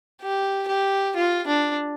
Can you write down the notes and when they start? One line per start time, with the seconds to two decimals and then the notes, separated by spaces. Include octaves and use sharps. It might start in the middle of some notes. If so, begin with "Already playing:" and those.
0.22 G4
0.68 G4
1.16 F4
1.47 D4